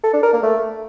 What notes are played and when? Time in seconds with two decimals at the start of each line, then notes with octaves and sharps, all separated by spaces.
0.03 A4
0.13 D4
0.23 A#4
0.33 A#3
0.43 A3